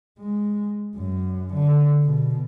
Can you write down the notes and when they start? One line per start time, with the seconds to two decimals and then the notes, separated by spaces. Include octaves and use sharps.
0.18 G#3
0.96 F#2
1.54 D3
2.03 B2